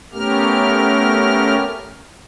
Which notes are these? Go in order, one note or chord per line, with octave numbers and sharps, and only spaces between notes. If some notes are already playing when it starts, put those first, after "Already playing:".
A3 B3 C#4 G4 A#4 F6